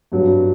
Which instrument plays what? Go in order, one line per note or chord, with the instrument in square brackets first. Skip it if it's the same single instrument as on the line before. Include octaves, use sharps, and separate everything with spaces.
[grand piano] G2 F#3